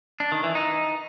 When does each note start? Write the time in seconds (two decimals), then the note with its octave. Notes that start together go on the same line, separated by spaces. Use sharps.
0.20 D4
0.32 D#3
0.43 E3
0.55 D#4